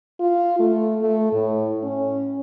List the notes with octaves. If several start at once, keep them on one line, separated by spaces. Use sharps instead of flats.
F4
A3
A3
A2
C#4